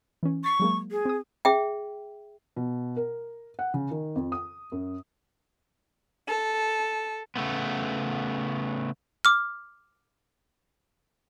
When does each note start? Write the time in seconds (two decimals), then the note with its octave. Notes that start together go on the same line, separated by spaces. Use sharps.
0.23 E3 C#4
0.44 C#6 A6 B6 C7
0.59 F#3 G#3 A#3
0.91 G#4
1.05 C4 D#6
1.45 G#4 E5 G5
2.56 B2
2.97 A#4
3.59 F#5
3.74 C#3
3.91 D#3
4.16 F2
4.32 D#6
4.72 F#2
6.28 A4
7.35 C#3 A3 B3
9.25 D6 F6